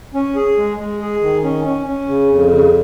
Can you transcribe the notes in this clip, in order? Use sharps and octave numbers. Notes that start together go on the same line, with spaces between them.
C#4
G#4
G#3
G#3
G#4
D#3
C#4
C#4
C#4
C#3
F2
C#3